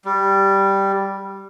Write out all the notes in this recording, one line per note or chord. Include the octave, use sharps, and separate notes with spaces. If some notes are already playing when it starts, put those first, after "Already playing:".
G3